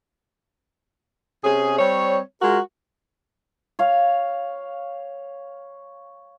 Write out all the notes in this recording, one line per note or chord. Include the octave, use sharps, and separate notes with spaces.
C3 C#4 G#4
G3 C4 C#5
G#3 F4 F#4 A#4
C#5 F5